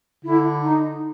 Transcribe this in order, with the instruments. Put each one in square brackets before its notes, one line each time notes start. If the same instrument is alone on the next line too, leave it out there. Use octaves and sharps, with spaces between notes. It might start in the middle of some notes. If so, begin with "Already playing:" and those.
[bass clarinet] D3 [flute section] E4
[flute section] D#4